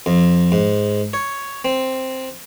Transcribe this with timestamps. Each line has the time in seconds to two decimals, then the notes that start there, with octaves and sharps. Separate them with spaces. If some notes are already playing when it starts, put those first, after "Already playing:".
0.06 F2
0.52 G#2
1.13 C#5
1.65 C4